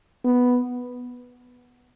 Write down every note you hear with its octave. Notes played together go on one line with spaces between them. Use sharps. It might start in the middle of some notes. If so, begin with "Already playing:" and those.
B3